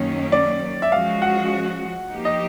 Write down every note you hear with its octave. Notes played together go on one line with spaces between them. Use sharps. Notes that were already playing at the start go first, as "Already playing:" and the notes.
Already playing: F#2 D#3 F#3 A#3 C#4
D5
E5
F3 G#3 C#4 F#4 F5
F#5
F3 A#3 D#4 G4
D#5